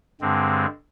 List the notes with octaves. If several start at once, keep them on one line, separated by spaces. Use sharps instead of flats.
G2 D3 G#3 C4